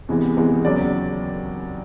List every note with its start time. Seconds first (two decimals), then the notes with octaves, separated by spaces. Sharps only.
0.09 E2 C3 E3 G#3 B3
0.36 E2 C3 E3 G#3 B3
0.65 D#2 C#3 F#3 B3 D5